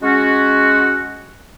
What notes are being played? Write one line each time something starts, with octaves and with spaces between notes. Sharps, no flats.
G#3 C#4 F#4